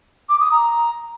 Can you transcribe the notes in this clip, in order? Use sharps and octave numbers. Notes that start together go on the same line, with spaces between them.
D6
D#6
A#5